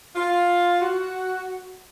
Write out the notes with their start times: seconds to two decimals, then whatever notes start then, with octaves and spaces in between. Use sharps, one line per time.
0.16 F4
0.81 F#4